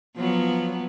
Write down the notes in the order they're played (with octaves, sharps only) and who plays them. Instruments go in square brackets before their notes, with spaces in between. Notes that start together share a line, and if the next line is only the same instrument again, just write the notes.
[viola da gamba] F3 F#3 B3